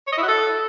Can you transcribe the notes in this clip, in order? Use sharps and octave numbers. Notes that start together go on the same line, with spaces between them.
C#5
D#5
E4
F#4
A4